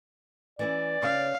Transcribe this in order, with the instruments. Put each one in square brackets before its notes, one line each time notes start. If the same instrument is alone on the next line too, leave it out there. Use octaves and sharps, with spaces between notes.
[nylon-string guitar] E3 C#4 E4 [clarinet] D5
[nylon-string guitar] C#3 C#4 [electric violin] F5